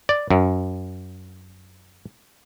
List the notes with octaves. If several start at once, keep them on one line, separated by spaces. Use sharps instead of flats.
D5
F#2